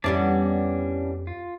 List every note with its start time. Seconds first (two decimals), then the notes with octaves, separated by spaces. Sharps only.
0.04 F2 E3 G3 B3 C#4 D4 D5
1.27 F4